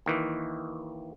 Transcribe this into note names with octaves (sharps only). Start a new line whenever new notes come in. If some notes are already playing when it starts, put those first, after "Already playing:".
D#2 D#3 E3